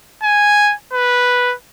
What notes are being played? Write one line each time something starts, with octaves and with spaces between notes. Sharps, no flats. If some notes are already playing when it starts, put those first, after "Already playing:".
G#5
B4